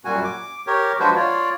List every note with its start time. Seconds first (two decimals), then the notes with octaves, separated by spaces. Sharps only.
0.05 F#2 A#2 G3 F#4 G#5
0.24 D6
0.67 G4 A#4 C#5
1.00 F3 G#3 D4 F#4 B4 C5
1.16 F4 C#5 D5